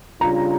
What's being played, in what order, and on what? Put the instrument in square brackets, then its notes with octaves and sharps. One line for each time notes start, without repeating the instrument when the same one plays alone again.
[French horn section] C#3 G3 D4 F4 [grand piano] A#5